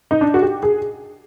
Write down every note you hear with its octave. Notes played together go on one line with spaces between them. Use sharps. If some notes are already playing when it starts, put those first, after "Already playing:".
D#4
D4
F#4
G4
G#4